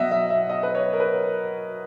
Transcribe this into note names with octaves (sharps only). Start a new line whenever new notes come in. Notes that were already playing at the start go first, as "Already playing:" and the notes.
Already playing: B2 F#3 D#5 E5 F#5
E5
E5
D#5
B4
C#5
A#4
B4